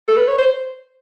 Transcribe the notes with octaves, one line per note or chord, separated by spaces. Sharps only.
A4
B4
C#5
C5